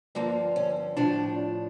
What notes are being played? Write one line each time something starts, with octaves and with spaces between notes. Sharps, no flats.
G2 D3 F3 A#3
C#4
A2 F3 D4